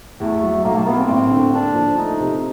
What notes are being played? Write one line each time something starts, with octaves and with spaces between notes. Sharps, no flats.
E2 A3
F#3
B1 A#3
A3
A#3 B3
C4
A1
D3
A#3 D4
F3
A3 D#4
C3